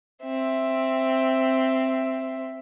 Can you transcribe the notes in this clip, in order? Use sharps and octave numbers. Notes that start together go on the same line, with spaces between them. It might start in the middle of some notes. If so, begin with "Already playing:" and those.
C4 E5